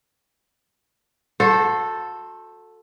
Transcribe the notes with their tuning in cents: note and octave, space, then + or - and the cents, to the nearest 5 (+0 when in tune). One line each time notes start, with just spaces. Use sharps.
F#4 -30 A4 +0 C5 +0